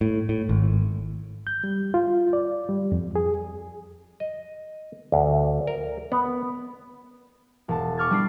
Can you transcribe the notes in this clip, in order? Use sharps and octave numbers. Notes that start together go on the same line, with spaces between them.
A2
A2
G#1
G6
G3
F4
D5
G3
F2
G#4
D#5
D2
A#4
B3
E1 A5
C#6 D6 F6 G#6 A6
G3 D4 C7